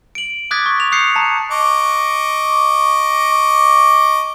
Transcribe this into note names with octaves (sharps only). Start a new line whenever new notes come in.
D7 F#7
D6 D#6 F#6 G#6 A6 B6
C#6
F7
D#6 F#6 G6 C7 C#7
A5 A#5
D#5 C#6 D6